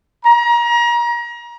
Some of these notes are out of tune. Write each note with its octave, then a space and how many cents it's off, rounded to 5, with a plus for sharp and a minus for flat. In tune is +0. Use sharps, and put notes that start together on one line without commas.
A#5 +30